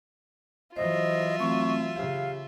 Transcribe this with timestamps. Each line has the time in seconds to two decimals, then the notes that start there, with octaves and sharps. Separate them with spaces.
0.76 E3 F#3 F4 C5 D#5 E5
1.40 E3 F#3 A3 C4 F5 C#6
1.96 C#3 G4 F5